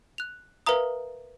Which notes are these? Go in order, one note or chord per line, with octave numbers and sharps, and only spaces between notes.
F#6 F7
A#4 B4 E5 F5 A#5 D#6